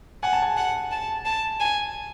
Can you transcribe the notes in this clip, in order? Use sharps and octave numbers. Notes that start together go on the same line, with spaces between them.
F#5 G#5
A5
G#5
F#5
A5
A5
G#5